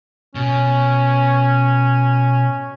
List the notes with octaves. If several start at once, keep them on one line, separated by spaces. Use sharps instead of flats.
B2 C#4